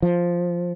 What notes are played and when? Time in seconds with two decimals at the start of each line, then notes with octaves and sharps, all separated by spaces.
0.02 F3